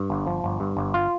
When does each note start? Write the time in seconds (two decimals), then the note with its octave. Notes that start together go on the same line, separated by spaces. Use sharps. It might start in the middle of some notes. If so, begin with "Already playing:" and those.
Already playing: G2
0.10 G1
0.26 F3
0.44 G1
0.60 G2
0.77 G1
0.94 F4